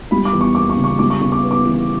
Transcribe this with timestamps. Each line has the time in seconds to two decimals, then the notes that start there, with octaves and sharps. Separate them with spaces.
0.11 G3 B5
0.25 D6
0.33 E2
0.41 C#6
0.55 A#3 D6
0.70 C#6
0.76 C#3
0.84 C#6
0.99 G3 D6
1.10 C#6
1.20 C#3 C#6
1.32 D6
1.44 B3
1.51 D6
1.65 E3